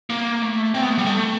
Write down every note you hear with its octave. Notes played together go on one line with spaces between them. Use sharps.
A#3
A3
C4
B3
A3
G3
A3